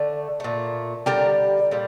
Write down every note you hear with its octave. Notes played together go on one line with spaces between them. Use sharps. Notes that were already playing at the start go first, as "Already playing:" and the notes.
Already playing: D3 A3
A#2 A3
D3 G3 G4 A#4
A#2 G3